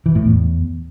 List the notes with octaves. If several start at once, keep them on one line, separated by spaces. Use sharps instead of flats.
E3
A2
E2